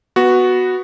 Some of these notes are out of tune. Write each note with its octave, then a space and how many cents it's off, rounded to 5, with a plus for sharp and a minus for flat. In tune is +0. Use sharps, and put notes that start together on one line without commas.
B3 +0 F#4 +0